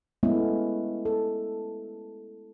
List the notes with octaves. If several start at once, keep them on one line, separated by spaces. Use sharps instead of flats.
G#3 A3 B3 C#4 E4
A4